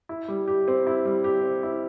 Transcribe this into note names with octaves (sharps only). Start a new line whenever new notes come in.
E4
G3
G4
C4
E4
G3
G4
C4
E4